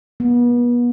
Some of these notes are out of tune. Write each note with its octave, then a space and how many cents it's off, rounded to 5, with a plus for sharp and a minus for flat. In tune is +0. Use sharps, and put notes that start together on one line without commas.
B3 -35